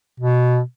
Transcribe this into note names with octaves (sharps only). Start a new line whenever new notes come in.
B2